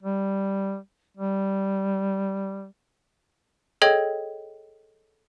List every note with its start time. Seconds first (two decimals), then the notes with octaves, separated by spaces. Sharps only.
0.02 G3
1.17 G3
3.82 G#4 A4 C#5 D#5 G5 G#6